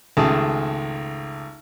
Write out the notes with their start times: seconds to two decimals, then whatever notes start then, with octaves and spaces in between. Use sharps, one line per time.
0.17 G#1 C#2 A3 G#4 A5